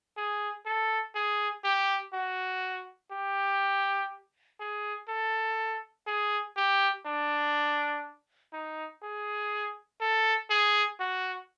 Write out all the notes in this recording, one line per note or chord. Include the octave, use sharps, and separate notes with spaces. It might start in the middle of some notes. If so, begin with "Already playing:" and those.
G#4
A4
G#4
G4
F#4
G4
G#4
A4
G#4
G4
D4
D#4
G#4
A4
G#4
F#4